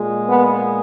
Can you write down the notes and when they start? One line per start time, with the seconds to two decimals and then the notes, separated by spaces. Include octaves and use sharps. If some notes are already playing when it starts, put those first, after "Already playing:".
Already playing: A#2 G#3
0.29 B3